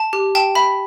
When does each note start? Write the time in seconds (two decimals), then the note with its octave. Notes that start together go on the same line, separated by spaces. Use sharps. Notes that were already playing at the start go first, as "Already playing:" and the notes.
Already playing: A5
0.13 G4
0.35 G5 A5
0.55 E5 B5